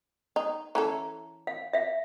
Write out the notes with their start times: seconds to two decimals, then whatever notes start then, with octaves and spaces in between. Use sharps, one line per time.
0.36 D#4
0.75 E3 C#4 A4 A#5
1.47 F5
1.73 E5 F5